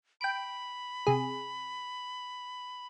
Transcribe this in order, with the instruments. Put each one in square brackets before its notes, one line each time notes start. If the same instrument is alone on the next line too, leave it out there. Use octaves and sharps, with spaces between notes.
[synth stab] G5 D7 [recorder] B5
[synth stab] C3 G#4